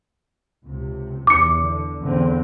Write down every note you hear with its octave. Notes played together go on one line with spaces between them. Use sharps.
C#2 C3
E2 D6 C#7
D3
E2 D3 C4